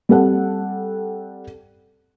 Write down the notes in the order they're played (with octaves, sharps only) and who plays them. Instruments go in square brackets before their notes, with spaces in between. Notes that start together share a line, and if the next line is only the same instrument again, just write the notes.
[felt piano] G3 C4 A4 F#5